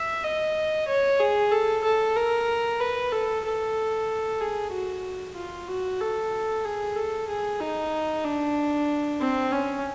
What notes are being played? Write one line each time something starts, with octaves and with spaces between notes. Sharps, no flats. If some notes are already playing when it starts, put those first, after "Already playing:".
Already playing: E5
D#5
C#5
G#4
A4
A4
A#4
B4
A4
A4
G#4
F#4
F4
F#4
A4
G#4
A4
G#4
D#4
D4
C4
C#4